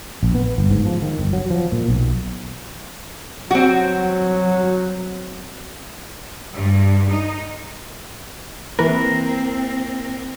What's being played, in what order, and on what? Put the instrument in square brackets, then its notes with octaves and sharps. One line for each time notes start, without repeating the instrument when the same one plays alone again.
[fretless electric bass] A#1
B3
G1
G#2
F3
D#3
G1
F#3
F3
A#2
B1
[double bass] F#3 [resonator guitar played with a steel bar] C4 F#4
[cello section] G2
D#4
[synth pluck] E3 B4 [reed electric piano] A#3 E4 [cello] C4 [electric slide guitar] A#4